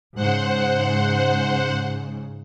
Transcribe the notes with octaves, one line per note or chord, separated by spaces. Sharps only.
G#2 C#3 C5 F#5